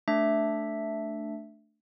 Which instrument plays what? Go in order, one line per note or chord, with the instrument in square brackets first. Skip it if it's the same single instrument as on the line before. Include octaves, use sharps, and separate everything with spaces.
[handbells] A3 D4 E5